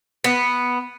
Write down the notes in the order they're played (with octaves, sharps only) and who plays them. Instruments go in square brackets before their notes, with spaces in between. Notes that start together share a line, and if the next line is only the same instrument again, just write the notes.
[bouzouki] B3